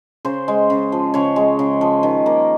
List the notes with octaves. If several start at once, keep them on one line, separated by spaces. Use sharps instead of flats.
C#3 C5
G#3
C#3
F3
C#3 C#5
G#3
C#3
F3
D#3
A#3